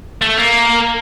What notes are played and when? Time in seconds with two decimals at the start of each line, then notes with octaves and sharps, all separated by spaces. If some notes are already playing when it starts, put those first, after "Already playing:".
0.22 A3
0.38 A#3